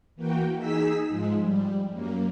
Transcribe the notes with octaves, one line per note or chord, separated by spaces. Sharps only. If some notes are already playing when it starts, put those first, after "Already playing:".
E3 A#3 F#4 G5
D#4 G#4 E6 B6
G#2 F3 G#3
G3
F#2 A#3